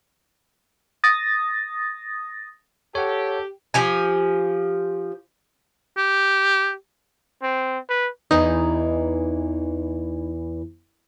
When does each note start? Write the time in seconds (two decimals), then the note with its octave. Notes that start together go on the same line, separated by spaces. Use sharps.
1.04 D#6 A6 A#6
2.95 G4 A4 C#5 F#5
3.74 F3 G4 G#5
5.97 G4
7.43 C4
7.89 B4
8.31 E2 E3 D#4